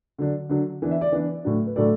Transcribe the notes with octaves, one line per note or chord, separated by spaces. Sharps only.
D3 F#3 D4
D3 F#3 D4
E3 B3 D4
E5
D5
E3 B3 D4 B4
A2 F#3 D4
B4
A2 F#3 D4 A4 D5